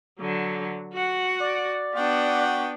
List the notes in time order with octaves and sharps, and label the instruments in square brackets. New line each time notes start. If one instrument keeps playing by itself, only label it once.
[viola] D3 F#3
F#4 F#5
[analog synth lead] D5
[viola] B3 D4 [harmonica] F#4 F#5 G5